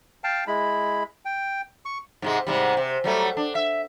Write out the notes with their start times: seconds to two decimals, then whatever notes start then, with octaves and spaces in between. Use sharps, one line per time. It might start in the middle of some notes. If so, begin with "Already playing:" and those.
0.24 F5 G5 A5
0.47 G#3 E4 B5
1.25 G5
1.85 C#6
2.22 G#2 C3 G#3
2.47 G#2 C3 G3
2.77 C3
3.04 F#3 G3 A3
3.37 D4
3.55 E5